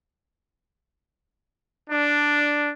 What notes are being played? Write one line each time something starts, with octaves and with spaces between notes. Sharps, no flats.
D4